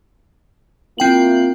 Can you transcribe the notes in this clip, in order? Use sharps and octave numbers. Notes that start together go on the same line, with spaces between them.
A#3 C4 E4 F4 G5 F#7